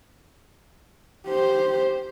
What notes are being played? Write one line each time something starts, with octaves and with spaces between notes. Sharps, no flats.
G4 C5